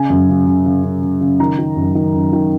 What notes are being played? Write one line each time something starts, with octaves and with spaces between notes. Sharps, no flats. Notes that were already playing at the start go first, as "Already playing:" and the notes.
Already playing: C#3 G#5
F#2
C#3
C#3
C#3
C#3
C#3
C#3
D#3 A#5
D#3
F#2
D#3
F#2
D#3